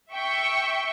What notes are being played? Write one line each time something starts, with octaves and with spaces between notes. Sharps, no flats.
E5 G5 C#6